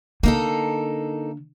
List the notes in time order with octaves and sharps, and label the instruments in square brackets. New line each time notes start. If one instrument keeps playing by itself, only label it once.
[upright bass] D3 [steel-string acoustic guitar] A#3 D#4 A4